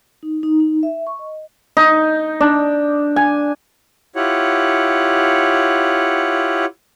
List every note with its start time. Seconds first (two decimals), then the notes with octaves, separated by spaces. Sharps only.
0.23 D#4
0.43 D#4
0.60 D#4
0.83 E5
1.07 C#6
1.19 D#5
1.77 D#4
2.41 D4
3.16 G#5
4.16 E4 F4 G4 C#5 F#5